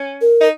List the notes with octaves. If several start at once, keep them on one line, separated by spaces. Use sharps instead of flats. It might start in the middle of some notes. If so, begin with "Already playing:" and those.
Already playing: C#4
A#4
D#4